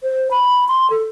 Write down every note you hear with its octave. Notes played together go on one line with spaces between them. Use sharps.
C5
B5
C6
A4